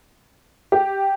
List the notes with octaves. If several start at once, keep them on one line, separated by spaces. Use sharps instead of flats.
G4